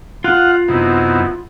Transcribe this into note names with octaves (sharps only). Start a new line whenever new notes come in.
F4 F5 F#5 F#6
F#2 C3 B3 D#4 E4